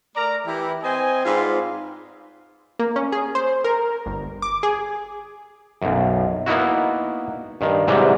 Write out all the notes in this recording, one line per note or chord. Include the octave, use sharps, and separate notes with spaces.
A3 A#4 D5 A#5
E3 E4 G4
C4 C5 D#5 G#5
G#2 C4 F4 B4 D5 F5
A#3
C#4
G#4
C5
A#4
G1
D6
G#4
B1 F#2
A#3 B3 D#4 E4 F#4
G2 D#3
G#2 C3 E3 F#3 G3